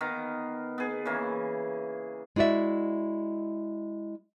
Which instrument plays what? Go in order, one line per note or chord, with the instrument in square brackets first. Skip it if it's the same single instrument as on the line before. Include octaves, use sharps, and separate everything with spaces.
[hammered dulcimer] D#3 B3 F5 A#5
B3 G#4
C#3 E3 A#3
[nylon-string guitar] G#3 E4 F#4 D5 E5